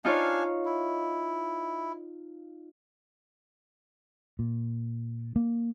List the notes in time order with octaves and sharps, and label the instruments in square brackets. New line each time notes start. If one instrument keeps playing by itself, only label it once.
[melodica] D4 F5 G#5 [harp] D#4 F4 C#5
[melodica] E4
[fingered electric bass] A#2
A#3